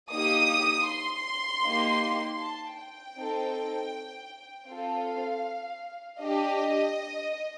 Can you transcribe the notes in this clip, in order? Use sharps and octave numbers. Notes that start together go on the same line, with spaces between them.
A#3 D#4 G4 D#6
C6
A#3 D#4 G4
A5
G5
C4 D#4 A4
C4 F4 A4 F5
D4 G4 D#5